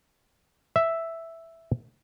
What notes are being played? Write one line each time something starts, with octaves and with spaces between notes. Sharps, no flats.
E5